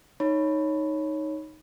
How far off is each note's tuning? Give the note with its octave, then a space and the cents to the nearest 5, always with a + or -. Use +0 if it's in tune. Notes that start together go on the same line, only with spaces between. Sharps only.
D#4 +0 C#5 +0 B5 +0